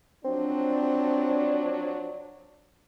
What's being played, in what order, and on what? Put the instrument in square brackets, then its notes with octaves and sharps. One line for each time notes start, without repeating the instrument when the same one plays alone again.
[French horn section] F3 F#3 D4 [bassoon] C4